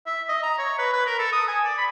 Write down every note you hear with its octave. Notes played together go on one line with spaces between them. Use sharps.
E5
D#5
A#5
C#5
B4
B4
A#4
A4
D#6
G#5
D5
B5